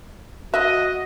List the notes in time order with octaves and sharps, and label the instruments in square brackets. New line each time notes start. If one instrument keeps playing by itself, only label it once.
[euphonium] F#4 [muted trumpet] D#5 [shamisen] E5 [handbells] F#6